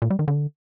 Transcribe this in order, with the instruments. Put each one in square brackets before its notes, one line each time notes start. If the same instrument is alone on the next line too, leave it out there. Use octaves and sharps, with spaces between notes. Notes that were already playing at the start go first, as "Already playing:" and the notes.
[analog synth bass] A#2
G3
D#3
D3